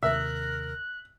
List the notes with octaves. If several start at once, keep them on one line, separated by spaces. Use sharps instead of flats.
D#2 C3 A#4 E5 F#6